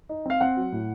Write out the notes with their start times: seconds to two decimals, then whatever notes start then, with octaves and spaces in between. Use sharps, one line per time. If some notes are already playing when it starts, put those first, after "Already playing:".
0.09 D#4
0.26 C4 F5
0.41 C4 F#5
0.57 F#3
0.72 A2